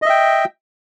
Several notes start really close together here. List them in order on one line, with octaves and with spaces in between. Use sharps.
D#5 E5 G5